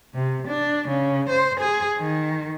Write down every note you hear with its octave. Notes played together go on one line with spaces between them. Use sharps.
C3
D4
C#3
C5
G#4
D#3